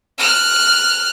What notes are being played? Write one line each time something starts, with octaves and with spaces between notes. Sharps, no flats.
F6 F#6